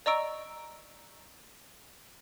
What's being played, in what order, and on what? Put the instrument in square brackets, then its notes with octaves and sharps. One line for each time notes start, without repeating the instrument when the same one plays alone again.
[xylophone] D5 D#5 A#5 C#6 E6 D7